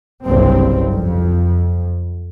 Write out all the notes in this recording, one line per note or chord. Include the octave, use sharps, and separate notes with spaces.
F#1 C2 G2 C4
F2